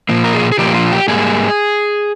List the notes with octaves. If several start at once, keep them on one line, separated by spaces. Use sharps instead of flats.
A#2 F3 A#3
A#4
G#4
G#4
A#2 F3 A#3 G4
F4
G4
G#2 G3 A#3 G#4